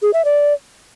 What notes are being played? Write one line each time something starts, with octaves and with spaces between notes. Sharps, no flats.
G#4
E5
D5